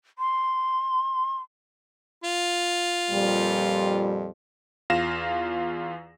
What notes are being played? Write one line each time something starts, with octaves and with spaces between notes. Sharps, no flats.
C6
F4
F2 A#2 G3
E2 F4 F5 A#6 E7